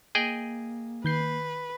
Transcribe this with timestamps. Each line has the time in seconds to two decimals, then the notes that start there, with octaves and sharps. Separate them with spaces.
0.15 A#3 G#4 D#5 G5
1.05 D#3 B4 G6 C7